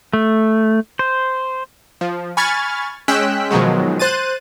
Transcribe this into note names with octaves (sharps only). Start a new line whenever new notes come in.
A3
C5
F3
G#5 B5 C#6 F6 G#6 A6
G#3 C#4 G5 E6 F#6 B6
B2 D#3 F3 F#3 G#3
C5 F#6 A6 D#7